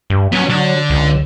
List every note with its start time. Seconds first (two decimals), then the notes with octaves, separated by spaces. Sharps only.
0.10 G2
0.33 F#3 B3 C#4
0.50 D3 F#3 D4
0.90 C#2